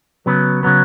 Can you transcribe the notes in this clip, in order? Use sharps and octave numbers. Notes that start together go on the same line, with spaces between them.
C#3 F#3 B3
C#3 F#3 B3